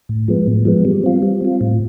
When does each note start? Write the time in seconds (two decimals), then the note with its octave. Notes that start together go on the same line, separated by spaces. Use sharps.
0.09 A2
0.28 F3 G#3 B3
0.47 A2
0.65 F3 G#3 B3
0.85 G3
1.04 C4 F4
1.22 G3
1.41 C4 F4
1.61 A2